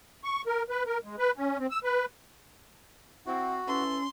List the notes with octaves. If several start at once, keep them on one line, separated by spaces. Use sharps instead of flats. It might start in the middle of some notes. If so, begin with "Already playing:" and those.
C#6
A#4
B4
A#4
G#3
B4
C#4
C4
E6
B4
C4 E4 F#4 F#5
C#4 E4 A4 B4 C6